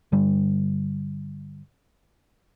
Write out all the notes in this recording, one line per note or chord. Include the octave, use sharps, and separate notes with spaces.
G2 D3 G3